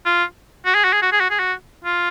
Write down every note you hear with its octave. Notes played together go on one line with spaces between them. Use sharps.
F4
F#4
G#4
F#4
G#4
F#4
G#4
F#4
G#4
F#4
F4